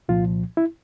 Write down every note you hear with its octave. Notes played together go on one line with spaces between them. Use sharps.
C2 A#2 F3 F4
E4